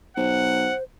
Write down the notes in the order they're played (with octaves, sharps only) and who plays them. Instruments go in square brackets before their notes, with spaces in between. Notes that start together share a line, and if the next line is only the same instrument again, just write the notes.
[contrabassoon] B1 [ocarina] C5 [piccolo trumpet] F#5